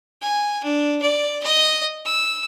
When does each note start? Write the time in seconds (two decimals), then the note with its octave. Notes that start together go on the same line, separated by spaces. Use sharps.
0.22 G#5
0.64 D4
1.02 D5
1.43 D#5
2.05 E6